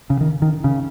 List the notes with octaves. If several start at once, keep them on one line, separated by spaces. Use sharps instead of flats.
C#3
D#3
D#3
C#3